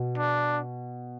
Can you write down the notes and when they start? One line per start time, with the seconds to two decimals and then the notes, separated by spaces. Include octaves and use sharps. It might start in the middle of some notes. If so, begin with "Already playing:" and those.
Already playing: B2
0.18 D4